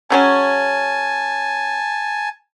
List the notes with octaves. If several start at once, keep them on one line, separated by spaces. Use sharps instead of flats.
C#3 F#3 C#4 G#5 A5